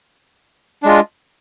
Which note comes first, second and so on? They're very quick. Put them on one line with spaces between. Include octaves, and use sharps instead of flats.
D4 G#3 F4